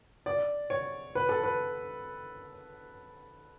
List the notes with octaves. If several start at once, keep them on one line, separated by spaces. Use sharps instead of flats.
D5
C#5
B4
A4
B4